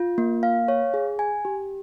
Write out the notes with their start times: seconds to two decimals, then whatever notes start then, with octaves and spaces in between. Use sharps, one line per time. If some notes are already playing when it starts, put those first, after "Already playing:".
Already playing: F4
0.18 A#3
0.43 F5
0.68 C#5
0.94 G#4
1.19 G#5
1.45 G4